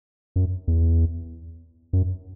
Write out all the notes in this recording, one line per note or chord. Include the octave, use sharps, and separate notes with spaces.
F#2
E2
F#2